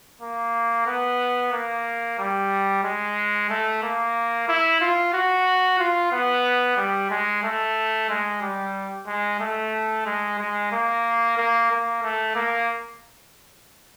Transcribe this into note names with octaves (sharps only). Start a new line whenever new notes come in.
A#3
B3
A#3
G3
G#3
A3
A#3
E4
F4
F#4
F4
B3
G3
G#3
A3
G#3
G3
G#3
A3
G#3
G#3
A#3
A#3
A#3
A3
A#3